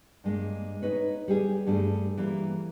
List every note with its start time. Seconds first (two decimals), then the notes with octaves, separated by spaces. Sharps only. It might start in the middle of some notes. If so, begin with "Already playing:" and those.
0.24 G2 G#3 A#3
0.82 D#4 B4 C#5
1.28 G3 G4 G#4
1.66 G2 G3 A3 G#4
2.18 E3 G3 A#3